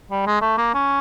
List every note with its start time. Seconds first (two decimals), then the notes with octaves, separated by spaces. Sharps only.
0.11 G3
0.26 G#3
0.41 A3
0.57 A#3
0.74 C#4